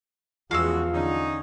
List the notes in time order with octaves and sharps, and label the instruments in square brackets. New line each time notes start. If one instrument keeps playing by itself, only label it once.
[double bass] E2 B3 [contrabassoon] F3 [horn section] G#3 C#4 F#4 [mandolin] F5 E6
[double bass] D3 [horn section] C#4 D#4